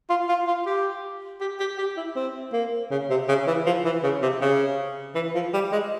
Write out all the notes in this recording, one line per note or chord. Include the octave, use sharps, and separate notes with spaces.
F4
F4
F4
G4
G4
G4
G4
E4
C4
A#3
C#3
C3
C#3
E3
F3
E3
C#3
C3
C#3
E3
F3
G3
G#3